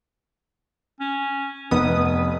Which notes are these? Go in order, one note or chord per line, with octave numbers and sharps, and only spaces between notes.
C#4
F1 B3 B4 D#6